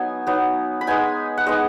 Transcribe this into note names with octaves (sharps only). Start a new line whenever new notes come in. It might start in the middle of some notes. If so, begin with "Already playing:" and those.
Already playing: F#3 B3 D#4 G#5
F#3 B3 D#4
B5
G#3 B3 D#4 G#5
F#5
G#3 B3 D#4 D#5